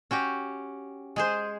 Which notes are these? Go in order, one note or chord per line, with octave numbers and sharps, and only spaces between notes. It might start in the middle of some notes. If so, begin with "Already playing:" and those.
C#4 F#4 G4
G#3 G#4 C5